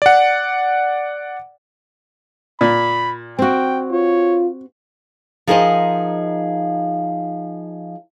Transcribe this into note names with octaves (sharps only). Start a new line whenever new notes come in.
D5 F#5
A#2 B5
C4 F#4 G5
F4 C#5
F3 D#4 G#4 A#4 C5 D#5